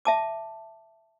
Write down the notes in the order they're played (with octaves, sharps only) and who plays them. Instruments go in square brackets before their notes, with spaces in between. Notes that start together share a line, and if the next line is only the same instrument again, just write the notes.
[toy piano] E5 A5 D6